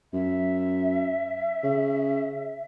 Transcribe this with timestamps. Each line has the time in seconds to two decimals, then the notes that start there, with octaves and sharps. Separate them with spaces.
0.13 F#2 E5
1.63 C#3